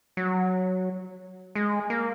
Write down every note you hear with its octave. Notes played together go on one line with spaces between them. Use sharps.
F#3
G#3
A#3